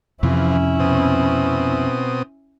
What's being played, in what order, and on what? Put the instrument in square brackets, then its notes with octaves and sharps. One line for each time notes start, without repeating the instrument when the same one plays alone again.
[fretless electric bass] F2 C3 [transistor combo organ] E3 F3 [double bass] C#4 E4
[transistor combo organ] B2 C4 D#6